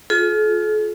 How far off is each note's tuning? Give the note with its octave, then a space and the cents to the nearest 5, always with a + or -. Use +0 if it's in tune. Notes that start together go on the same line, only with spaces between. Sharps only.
F4 +15 A4 -45